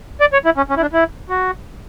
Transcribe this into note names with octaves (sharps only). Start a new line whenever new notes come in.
D5
C#5
E4
C#4
C#4
E4
D4
E4
F#4